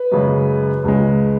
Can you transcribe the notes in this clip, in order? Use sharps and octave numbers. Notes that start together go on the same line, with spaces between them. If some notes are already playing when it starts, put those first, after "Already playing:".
Already playing: B4
F#2 C#3 G#3
C#2 C#3 G#3